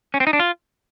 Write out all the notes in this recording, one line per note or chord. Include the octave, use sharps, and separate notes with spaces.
C#4
C4
D#4
D4
F4